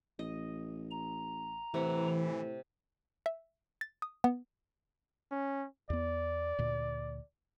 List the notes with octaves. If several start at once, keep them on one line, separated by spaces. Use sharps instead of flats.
A1 D#5
A#5
A2 C3 E3 F#5
E5
A6
D#6
B3
C#4
E2 B3 D5
D2 A#2